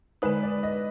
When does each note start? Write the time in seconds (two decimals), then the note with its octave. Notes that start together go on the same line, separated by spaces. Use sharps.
0.22 D3 G#3 D#4 B4
0.43 D5
0.63 D#5